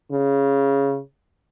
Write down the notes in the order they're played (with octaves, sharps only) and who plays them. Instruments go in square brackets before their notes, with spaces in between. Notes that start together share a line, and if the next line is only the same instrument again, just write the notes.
[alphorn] C#3